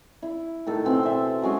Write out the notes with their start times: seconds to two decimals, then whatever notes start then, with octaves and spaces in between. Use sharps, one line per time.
0.22 E4
0.66 A2 D#3 A4
0.85 B2 E3 C4
1.03 C5 E5
1.42 F#3 G#3 C#4 G#4